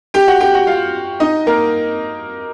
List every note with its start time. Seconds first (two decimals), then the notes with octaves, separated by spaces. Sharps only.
0.14 G4 G5
0.28 F#4 F#5
0.41 G4 G5
0.54 F#4 F#5
0.67 F4 F5
1.20 D#4 D#5
1.47 A#3 A#4